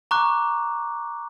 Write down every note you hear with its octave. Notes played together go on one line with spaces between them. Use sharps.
A#5 C#6 D6 F#6